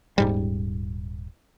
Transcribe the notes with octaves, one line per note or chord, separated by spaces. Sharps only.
D#1 G#2 G3